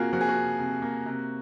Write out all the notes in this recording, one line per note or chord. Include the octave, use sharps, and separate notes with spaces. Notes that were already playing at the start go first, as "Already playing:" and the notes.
Already playing: C3 A#3 F4 F#4 G#4
F3 F#4
G#4
F#4
C3
C3
A#3
C3